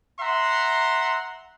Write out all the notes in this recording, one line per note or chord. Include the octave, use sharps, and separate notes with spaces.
E5 F#5 A#5 C6